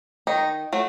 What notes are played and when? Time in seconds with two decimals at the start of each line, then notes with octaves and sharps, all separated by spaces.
0.27 D#3 D#4
0.73 F#3 A3